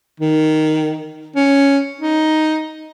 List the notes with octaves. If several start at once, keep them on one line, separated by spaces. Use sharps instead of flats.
D#3
C#4
D#4